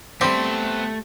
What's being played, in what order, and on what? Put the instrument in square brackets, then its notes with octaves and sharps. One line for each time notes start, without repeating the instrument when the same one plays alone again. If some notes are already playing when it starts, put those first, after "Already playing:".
[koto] G3 G4 [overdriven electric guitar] A3 [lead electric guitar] B3 C6 [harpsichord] C4